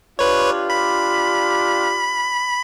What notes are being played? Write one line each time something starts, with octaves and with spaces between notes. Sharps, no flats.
D4 F4 G4 B4 C#5
B5